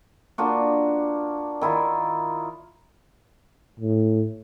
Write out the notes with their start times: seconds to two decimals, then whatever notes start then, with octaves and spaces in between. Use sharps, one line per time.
0.38 A#3 D4 F4 F#4
1.61 D#3 E4 F4
3.80 A2